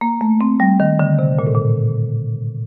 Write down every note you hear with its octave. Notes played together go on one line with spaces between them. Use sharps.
A#3
A3
C4
G3
D#3
D3
C3
A#2
A2
A#2